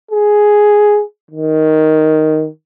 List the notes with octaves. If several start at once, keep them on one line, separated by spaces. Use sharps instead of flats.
G#4
D#3